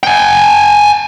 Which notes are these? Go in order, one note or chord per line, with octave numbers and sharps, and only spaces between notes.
G5 G#5